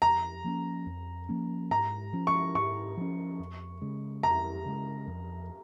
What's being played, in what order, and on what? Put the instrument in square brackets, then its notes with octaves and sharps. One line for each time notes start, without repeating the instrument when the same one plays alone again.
[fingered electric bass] F2 [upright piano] A#5
[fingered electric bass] F3 A#3 C#4
F2
F3 A#3 C#4
[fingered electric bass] G#2 [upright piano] A#5
[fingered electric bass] F3 C#4
[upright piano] C#6
[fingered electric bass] G#2 [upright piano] C#6
[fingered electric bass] F3 C#4
F2
C#3 G#3
[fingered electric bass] F2 [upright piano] A#5
[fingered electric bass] C#3 G#3
F2